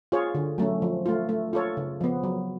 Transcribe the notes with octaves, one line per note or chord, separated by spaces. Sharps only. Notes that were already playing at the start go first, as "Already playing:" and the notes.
F4 G#4 C#5
D3
F#3 A3 C#4
F3
A3 F4
A3
F4 A4 C#5
C#3
F3 B3
F#3